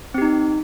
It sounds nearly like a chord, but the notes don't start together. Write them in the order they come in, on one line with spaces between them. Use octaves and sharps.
C4 G4 D#4